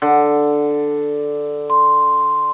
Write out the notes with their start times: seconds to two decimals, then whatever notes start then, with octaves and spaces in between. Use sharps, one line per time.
0.02 D3
1.70 C6